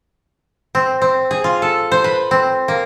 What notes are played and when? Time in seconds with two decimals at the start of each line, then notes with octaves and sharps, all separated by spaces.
0.75 C4
1.02 C4
1.31 G#4
1.44 F4
1.62 A4
1.92 C5
2.04 B4
2.31 C4
2.68 A#3